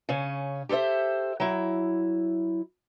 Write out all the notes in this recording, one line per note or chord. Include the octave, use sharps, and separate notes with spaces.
C#3 C#4
G4 A4 B4 C5 E5
F#3 E4